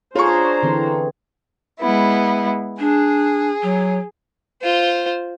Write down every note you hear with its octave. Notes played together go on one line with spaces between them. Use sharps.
D4 F4 G#4 C5 C#5 A#5 C#6
D3 E3 C4
G#3 B3 E4
D4 G#4
F#3
F4 C5